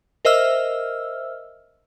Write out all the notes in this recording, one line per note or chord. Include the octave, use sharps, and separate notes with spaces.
A#4 C5 D#5 E5 E6 F6